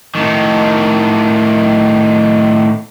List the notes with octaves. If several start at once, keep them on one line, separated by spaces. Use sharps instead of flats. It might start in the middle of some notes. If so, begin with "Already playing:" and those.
A2 D#3